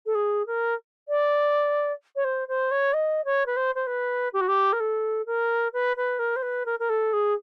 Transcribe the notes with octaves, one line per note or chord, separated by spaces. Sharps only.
A4
G#4
A#4
D5
C#5
C5
C5
C#5
D#5
C#5
B4
C5
C5
B4
G4
F#4
G4
A#4
A4
A#4
B4
B4
A#4
C5
B4
A#4
A#4
A4
G#4